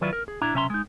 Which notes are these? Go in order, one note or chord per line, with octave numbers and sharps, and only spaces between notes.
D#3 F#3 E4 F4 B4 D5
A#4
G#4
A#2 D4 E4 A#5
B1 C3 C#4 E5 A#5 C6
G#3 D#4